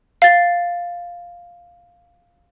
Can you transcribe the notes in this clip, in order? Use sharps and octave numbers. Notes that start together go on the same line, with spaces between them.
F5 A6